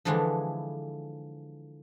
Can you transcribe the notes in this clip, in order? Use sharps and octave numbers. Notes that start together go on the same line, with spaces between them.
D3 E3 F3 G#3 D4 E4